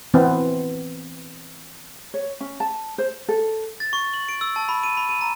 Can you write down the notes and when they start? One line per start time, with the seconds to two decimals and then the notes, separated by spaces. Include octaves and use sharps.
0.14 E3 B3 C4
2.14 C#5
2.41 C#4
2.60 A5
2.98 C5
3.29 A4
3.80 A6
3.93 C#6
4.14 F#7
4.29 D7
4.41 E6
4.56 A5
4.69 B5
4.83 D#7
4.97 B5
5.09 D#7
5.21 A#5